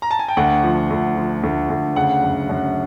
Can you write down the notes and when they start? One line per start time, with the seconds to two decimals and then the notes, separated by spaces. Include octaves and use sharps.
0.02 A#5
0.11 A5
0.19 G#5
0.28 G5
0.37 D2 F#5
0.63 F3
0.90 D2
1.16 F3
1.43 D2
1.70 D2
1.96 C#3 F#5
2.23 F#2
2.49 F#2